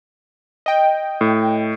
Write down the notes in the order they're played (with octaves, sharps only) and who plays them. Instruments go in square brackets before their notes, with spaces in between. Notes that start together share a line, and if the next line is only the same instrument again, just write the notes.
[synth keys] D#5 G5
[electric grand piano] A2